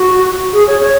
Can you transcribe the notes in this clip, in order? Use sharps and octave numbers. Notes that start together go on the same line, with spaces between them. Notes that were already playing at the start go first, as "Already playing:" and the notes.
Already playing: F#4
G#4
C#5
C#5